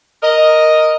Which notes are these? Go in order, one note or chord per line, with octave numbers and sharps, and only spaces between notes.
A#4 D#5